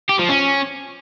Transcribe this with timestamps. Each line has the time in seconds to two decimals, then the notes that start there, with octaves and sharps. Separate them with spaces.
0.09 G4
0.19 F3
0.29 C#4